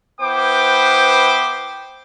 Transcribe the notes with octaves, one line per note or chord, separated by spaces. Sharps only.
B3 E4 B4 C5 G5 D6